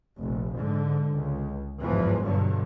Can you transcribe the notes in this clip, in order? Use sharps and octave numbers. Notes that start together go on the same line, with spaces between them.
F1 A#1
G#2 D3
C#2
G1 E2 G#2 E3 F3
G2 B2 D3 F#3